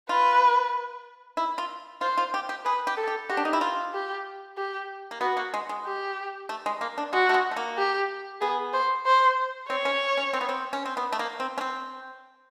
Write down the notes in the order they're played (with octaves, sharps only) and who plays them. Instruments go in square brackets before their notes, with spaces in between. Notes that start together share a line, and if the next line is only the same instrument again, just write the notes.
[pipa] F4 [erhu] B4
[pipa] E4
F4
[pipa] F4 [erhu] C5
[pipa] F4
G4
G4
[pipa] G#4 [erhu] B4
[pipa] G4
[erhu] A4
[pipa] G4
[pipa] F#4 [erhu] G4
[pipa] D4
D#4
E4
F4
[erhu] G4
G4
[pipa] A#3
[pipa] B3 [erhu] F#4
[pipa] A#3
G#3
G#3
[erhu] G4
[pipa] A3
G#3
A#3
D4
[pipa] G#3 [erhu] F#4
[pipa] A3
G#3
A3
A#3
[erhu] G4
[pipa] B3 [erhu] G#4
[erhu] C5
C5
[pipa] C4 [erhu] C#5
[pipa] C#4
C#4
C4
B3
C4
C#4
C4
B3
A3
A#3
C4
C#4
C4